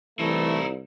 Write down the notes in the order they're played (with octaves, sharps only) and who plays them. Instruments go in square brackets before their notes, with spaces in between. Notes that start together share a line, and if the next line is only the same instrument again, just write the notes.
[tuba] C2 [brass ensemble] E3 A3 [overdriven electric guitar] D#4 E4